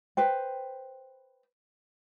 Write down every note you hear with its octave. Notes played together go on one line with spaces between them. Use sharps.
B4 C5 G5